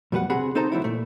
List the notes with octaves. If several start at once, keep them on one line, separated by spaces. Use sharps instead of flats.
F2 B2 G3 B4 F#5
D2 C3 G#4 F#5 B5
C4 D#4 A4 C5 A#5
C#2 E3 F#3 E4
A#2 A3